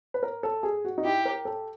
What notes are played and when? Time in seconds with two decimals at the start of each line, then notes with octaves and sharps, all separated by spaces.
0.14 B4
0.23 A#4
0.43 A4
0.63 G#4
0.85 F#4
0.98 D#4
1.04 E4 G4
1.25 A#4
1.45 A4